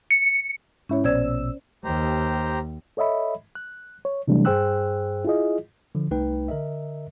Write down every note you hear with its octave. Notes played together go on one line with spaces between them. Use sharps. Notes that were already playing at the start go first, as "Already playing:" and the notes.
C#7
G#2 C#4 E4 C#5
A#1 B2 C5 D5 E6 G#6
D#2 G4 C5 A#5
A4 C#5 D#5 E5 B5
F#6
C#5
C3 E3 F#3 G3 A3 D4
G2 G#4 C5 G5 E6 F#6
E4 F4 G#4 D#5
D3 F3
C2 A3 D#4 B4 G5
D3 A#4 D#5 E5